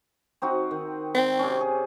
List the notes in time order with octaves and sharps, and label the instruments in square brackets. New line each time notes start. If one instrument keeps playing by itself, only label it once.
[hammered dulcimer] C4 D#4 F#4
D#3
[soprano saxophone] C4
[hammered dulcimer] C3 C#4
G#4